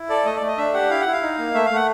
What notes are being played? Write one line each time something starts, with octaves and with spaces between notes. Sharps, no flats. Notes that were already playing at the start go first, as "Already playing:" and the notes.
Already playing: E4
A4 D5
A3 D#5
D5
A3
D#5
D4 E5
G4 F#5
E4 F5
F#5
E4
F5
D#4
A#3
A3 E5
F5
A3 F#5